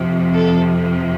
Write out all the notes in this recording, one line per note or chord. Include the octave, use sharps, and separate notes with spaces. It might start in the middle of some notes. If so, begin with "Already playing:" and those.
Already playing: F2 C3 F3
A4